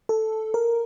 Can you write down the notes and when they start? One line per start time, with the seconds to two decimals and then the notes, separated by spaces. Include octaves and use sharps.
0.09 A4
0.54 A#4